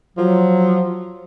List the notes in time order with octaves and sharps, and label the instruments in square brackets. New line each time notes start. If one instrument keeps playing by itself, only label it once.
[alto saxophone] F3 [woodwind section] F#3